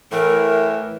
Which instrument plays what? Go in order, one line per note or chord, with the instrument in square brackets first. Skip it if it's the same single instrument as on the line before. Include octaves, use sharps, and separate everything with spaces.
[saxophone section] A2 E3 [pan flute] A#4